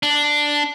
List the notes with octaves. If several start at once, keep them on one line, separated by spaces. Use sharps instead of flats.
D4